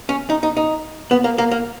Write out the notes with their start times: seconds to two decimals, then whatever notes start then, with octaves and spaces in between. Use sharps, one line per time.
0.09 C#4
0.30 D#4
0.43 D#4
0.57 D#4
1.11 B3
1.24 A#3
1.38 A#3
1.51 A#3